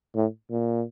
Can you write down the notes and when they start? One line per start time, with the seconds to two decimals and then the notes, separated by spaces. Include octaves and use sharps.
0.15 A2
0.50 A#2